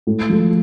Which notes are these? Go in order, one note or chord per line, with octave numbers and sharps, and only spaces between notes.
A2
F3 A3